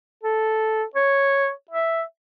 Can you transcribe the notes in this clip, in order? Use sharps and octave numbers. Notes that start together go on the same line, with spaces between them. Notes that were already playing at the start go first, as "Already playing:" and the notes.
A4
C#5
E5